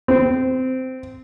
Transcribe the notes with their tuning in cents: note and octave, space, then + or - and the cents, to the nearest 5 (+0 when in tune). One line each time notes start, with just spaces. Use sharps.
C4 -15